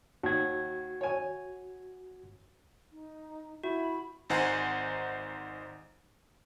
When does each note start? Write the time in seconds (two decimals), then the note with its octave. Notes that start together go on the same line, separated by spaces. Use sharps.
0.23 D#2 F#4 G#6
1.01 C#5 G#5
2.92 D#4
3.64 E4 F#4 B5
4.30 G#1 D#4 C5 F#5 G#5 A#5